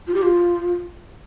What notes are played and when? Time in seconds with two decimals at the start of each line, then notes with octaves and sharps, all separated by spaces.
0.07 F4
0.14 G4
0.22 F4